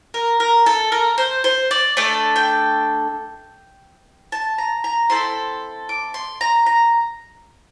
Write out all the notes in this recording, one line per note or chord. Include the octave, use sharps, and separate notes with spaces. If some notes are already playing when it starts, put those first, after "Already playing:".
A#4
A#4
A4
A#4
C5
C5
D5
A3 D4 A4 D5
G5
A5
A#5
A#5
C4 E4 A4 C6
D6
C6
A#5
A#5